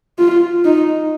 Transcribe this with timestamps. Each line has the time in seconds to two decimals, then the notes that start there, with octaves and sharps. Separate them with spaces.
0.19 F4
0.65 D#4